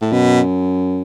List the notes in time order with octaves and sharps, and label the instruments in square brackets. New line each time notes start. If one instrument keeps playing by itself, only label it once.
[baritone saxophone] A2
[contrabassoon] F#2 [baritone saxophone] B2